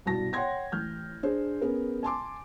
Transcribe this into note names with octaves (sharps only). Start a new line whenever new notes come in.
C2 G2 B2 A5 A#6
C#5 F#5 G5 C6 G#6 A#6
A1 F6 G6
D4 G#4 C5
B3 C#4 G#4 A#4
G#5 A5 C6 D6